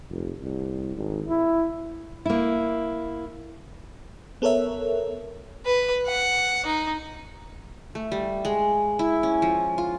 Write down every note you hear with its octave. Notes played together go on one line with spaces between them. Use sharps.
F1
C2
G#1
E4
A#3 E4
B3 A4 A#4 C#5 E5
B4
F#5
D#4
A3
G3
G#3
E4
C#4
F3
F4